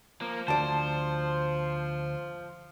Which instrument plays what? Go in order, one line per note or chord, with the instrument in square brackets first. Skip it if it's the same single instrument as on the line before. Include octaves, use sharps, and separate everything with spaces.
[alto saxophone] F3 [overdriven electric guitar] A#3
[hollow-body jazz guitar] D2 D5 [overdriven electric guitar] C5 [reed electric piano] A5